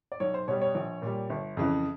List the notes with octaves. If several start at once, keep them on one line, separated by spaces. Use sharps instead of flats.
D5
B1 C#5
C5
B2 G3 C#5
C#5
A#1
A#2 G3
G1
F2 C#3 E3